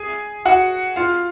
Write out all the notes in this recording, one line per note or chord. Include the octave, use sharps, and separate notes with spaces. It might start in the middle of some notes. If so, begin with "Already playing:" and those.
Already playing: G#4 G#5
F#4 F#5
F4 F5